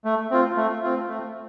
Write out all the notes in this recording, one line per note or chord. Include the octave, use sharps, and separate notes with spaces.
A3
C4 F4
A3
C4 F4
A3